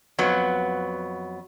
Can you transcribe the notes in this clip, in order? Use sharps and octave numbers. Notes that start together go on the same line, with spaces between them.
F2 F#3 B3